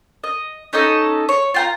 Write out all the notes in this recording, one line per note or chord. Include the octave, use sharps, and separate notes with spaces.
D#5
C#4 D#4 A4 D#5
C#5
F4 G5 A#5